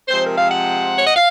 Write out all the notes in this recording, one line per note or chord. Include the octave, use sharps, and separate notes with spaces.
C3 F3 G#3 C4 C5
A#4
F5
F#5
C#5
D#5
F5